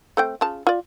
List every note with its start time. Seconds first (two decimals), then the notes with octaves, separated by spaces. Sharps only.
0.17 A3 C4 G5
0.41 C#3 F4 A5
0.67 F4 D5